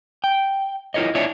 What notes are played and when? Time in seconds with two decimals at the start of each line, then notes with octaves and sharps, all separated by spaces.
0.24 G5
0.94 E4 F4 A#4 C#5 D#5
1.15 D4 E4 C#5 D5 E5